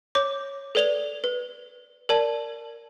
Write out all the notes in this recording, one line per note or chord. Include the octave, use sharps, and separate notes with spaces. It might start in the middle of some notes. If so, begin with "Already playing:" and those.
C#5 D6
A4 B4 D5 F7 G7
B4
A#4 D5 A5